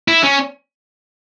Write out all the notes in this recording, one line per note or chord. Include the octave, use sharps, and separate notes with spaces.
E4
C#4